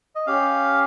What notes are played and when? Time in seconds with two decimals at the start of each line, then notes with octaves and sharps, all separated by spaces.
0.15 D#5
0.27 C#4 G4 F5